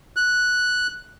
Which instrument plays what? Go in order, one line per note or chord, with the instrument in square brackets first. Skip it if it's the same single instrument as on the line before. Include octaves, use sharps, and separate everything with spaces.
[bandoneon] F#6